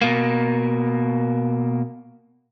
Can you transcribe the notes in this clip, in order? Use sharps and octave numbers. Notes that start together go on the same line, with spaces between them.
B2 A#3